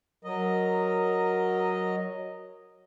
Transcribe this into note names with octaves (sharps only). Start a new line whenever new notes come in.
F#3 A#4 D#5